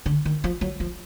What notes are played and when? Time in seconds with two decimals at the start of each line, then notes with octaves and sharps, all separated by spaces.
0.06 D3
0.25 D#3
0.44 F3
0.61 F#3
0.80 F3